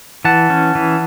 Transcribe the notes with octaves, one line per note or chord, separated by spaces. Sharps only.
E3 F#5 A5
C#4
E3